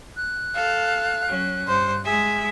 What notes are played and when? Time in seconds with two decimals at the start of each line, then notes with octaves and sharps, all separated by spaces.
0.17 F#6
0.55 A4 F5
1.28 F#3 C#4
1.68 G2 C5
2.05 G#3 G#4 E5